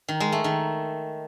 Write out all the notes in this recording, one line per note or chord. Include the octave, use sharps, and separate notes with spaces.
D#3
G#3
A3
D#3